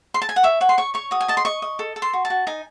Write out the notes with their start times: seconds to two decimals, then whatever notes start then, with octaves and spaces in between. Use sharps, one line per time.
0.14 C6
0.22 A5
0.29 G#5
0.36 F#5
0.43 C#5 E5
0.61 C#5 F#5
0.69 C6
0.78 C#5 C#6
0.94 C#5 C#6
1.11 F#4 D#6
1.21 G#5
1.28 D#5 A5
1.37 C6
1.45 D#5 C#6
1.62 D#5
1.79 A4
1.96 A4
2.02 C6
2.13 F#4
2.25 A5
2.30 F#4
2.47 D#4 G#5